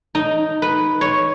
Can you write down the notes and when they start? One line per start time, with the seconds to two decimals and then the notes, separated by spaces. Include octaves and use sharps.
0.15 D#4
0.62 B4
1.01 C#5